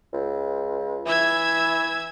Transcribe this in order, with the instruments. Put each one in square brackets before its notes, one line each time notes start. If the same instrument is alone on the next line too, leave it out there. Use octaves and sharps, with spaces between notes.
[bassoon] C#2
[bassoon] E3 [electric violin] E5 G#6